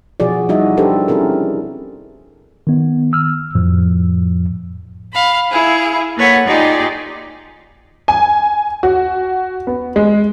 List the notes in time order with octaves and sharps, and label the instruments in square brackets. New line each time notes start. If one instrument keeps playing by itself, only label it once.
[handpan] B2 F3 F#4 G#4 D5
G3 D#4 E4 F#4 D#5 E5
D4 G4 A4 B4 C5
C4 C#4 E4 G#4 A#4
[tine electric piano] D#3 B3
E6 F6
F2 A2 F3
[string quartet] F5 B5
E4 G#4 F5
A#3 A4 B4 C#5 F#5
D#4 F4 G4 G#4 D5 D#5
[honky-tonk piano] G#5
F#4
B3
G#3